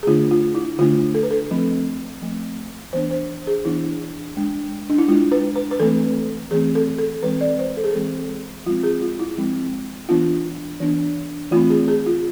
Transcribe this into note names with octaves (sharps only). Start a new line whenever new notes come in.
G#4
D3 A3 D4 F4
F4
E4
D3 A3 D4 F4
A4
B4
A4
F3 A3 C4
F3 A3 C4
E3 B3 D4 C5
C5
G#4
E3 B3 D4 E4
G#3 D4
D4
E4
G#3 D4 F4
B4
B4
B4
E3 A3 C4 A4
E3 A3 C4 G#4
A4
A4
E3 G#3 C4 B4
D5
C5
A4
G#4
E3 G#3 C4 A4
F3 G#3 C4 F4
G#4
F4
E4
F3 G#3 C4
E3 B3 D4 F4
E3 B3 D4
E3 A3 C4 F4
G#4
G#4
F4